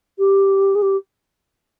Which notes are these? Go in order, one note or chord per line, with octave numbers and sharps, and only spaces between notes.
G4
G#4
G4